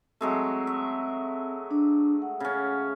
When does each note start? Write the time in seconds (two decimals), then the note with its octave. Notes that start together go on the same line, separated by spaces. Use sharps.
0.21 F#3 G#3 A3 C4
0.67 E5
1.71 D4
2.22 F#5
2.40 C#3 C#4